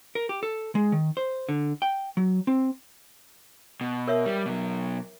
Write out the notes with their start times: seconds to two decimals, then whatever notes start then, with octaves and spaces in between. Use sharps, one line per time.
0.15 A#4
0.29 G4
0.43 A4
0.75 G#3
0.92 D#3
1.17 C5
1.49 D3
1.82 G5
2.17 F#3
2.47 C4
3.81 B2
4.08 A#4 C#5 E5
4.26 G3
4.46 B2 F#3